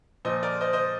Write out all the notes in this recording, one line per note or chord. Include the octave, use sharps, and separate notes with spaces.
A#2 F3 C5 D#5
A#4 D5
C5 D#5
C5 D#5